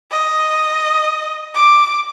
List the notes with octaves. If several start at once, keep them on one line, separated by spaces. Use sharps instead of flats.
D#5
D6